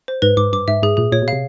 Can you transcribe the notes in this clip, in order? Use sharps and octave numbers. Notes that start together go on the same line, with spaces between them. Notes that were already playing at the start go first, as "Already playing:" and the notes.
C5
G#2 B4
G#2 D6
G2 D6
G#2 E5
G#2 G#4
A#2 G#4
A#2 C#5
B2
C3 F5